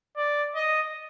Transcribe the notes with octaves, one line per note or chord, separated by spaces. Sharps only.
D5
D#5